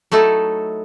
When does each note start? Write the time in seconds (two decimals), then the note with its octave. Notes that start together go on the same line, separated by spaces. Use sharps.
0.12 F#3 A3 D#4 E4 A4